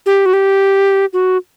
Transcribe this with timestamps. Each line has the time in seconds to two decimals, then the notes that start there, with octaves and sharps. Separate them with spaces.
0.06 G4
0.26 F#4
0.33 G4
1.13 F#4